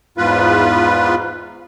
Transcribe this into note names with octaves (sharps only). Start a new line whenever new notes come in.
E2 G#2 F4 B4